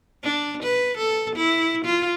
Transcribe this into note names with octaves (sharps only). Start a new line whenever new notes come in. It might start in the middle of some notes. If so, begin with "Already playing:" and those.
D4
B4
A4
E4
F4